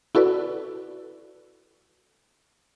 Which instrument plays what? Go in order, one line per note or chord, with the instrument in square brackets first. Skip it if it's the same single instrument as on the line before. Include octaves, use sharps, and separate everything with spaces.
[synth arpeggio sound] E4 F#4 A4 B4 D5